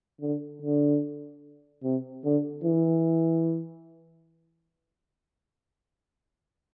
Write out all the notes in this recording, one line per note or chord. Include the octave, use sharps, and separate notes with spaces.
D3
D3
C3
D3
E3